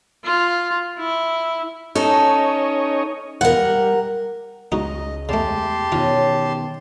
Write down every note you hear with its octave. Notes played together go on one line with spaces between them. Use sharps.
F4
E4
C#4 D#4 A4 C#5 D#5
E2 B2 F4 A#4 F#5
G3
C#2 G#3 D#4 F#4 D#5
E2 C#3 A3 G4 A5 C6
B2 D#3 F4 B4 C#5 D#5